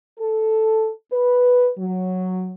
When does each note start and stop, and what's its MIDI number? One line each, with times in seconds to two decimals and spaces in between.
0.19 0.90 69
1.12 1.69 71
1.77 2.55 54